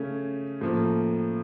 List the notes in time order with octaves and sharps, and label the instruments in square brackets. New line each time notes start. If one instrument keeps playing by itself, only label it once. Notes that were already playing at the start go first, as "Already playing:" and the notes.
Already playing: [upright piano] C#3 A3 C#4
A2 F3 A#3